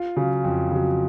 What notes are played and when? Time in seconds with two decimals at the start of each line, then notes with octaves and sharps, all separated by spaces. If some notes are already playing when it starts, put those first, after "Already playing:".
Already playing: F4
0.16 C#3 F#3
0.44 F2
0.71 C#3 F#3